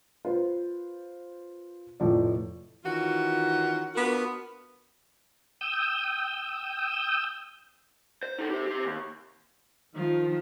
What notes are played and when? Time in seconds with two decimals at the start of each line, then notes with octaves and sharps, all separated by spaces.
0.25 F4 B4 C5
2.00 F1 A2 F3 D5
2.85 D#3 E3 C#4 F4 F#4
3.95 B3 D4 F4 F#4 A#4
5.61 G5 D#6 E6 G6
8.23 C5
8.38 D#4 A4
8.50 G4 C5
8.67 G4 C5
8.83 D#2
9.95 D#3 F3